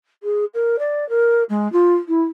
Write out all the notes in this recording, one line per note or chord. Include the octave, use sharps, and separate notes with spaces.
G#4
A#4
D5
A#4
G#3
F4
E4